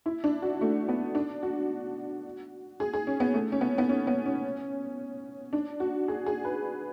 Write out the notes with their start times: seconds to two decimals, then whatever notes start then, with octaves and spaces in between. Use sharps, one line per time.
0.06 E4
0.24 D4
0.42 F#4
0.61 A3
0.89 B3
1.15 D4
1.43 F#4
2.80 G#4
2.93 G#4
3.07 C#4
3.20 B3
3.34 A3
3.52 C#4
3.61 B3
3.78 B3
3.89 C#4
4.07 B3
4.26 C#4
5.53 D4
5.80 F#4
6.08 G#4
6.26 G#4
6.45 B4